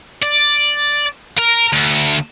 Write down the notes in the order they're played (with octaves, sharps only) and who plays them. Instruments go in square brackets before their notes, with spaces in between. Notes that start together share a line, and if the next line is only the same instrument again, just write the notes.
[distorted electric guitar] D5
A#4
D2